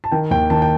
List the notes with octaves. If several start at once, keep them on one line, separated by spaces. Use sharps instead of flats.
A5
D#3 G5
D#2 G5
D#3 A5
G5